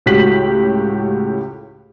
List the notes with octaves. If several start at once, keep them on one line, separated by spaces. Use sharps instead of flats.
C#2 A2 F#4 G4 B6 F#7